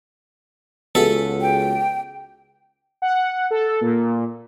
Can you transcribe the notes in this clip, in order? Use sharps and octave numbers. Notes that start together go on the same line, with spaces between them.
C#2 B3 F#4 G#4 A4 E5
G5
F#5
A4
A#2